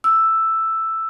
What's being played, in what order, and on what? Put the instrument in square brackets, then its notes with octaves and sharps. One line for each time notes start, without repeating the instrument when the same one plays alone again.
[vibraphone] E6